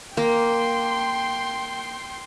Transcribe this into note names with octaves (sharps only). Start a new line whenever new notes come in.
A#3 G5 C6